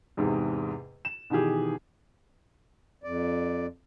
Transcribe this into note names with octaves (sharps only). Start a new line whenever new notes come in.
E2 G#2 C3
E7
B2 D#3 E3 G4 G#4
F2 D5